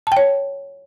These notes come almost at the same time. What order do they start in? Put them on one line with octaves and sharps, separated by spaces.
A5 G5 C#5